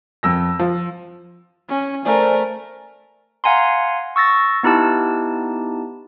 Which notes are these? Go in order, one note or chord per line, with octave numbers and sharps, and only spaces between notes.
F2 E6 A#6
F3
C#4
A3 A#4 C5 D5 G#5
F5 F#5 G#5 A#5 C6
C#6 E6 A6 A#6
B3 D#4 E4 G4 A5